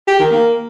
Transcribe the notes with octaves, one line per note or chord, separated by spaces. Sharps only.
G4
D#3
A#3